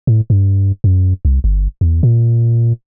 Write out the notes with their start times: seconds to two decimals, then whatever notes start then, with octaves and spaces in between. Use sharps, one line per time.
0.07 A2
0.30 G2
0.84 F#2
1.25 C2
1.44 G1
1.81 E2
2.03 A#2